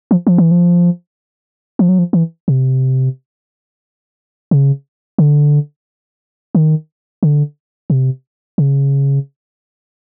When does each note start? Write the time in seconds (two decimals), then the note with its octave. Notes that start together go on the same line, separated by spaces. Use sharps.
0.11 F3
0.27 F3
0.38 E3
0.51 F3
1.79 F3
1.89 F#3
1.99 F3
2.13 E3
2.48 C3
4.51 C#3
5.18 D3
6.55 D#3
7.23 D3
7.90 C3
8.58 C#3